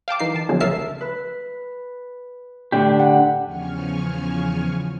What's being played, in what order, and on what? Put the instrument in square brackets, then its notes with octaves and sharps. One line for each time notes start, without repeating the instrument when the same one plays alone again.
[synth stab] F5 G5 A5 D6
E3 D#4 C7
D#3 A5
B2 D3 F3 F#3 G#3 A#3
A#1 C#3 A#4 E5 A5 C7
[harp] B4
[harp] A2 [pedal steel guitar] D3 D4 G4
[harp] F#5
[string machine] E2 C#3 F3 G#5 C#6 F6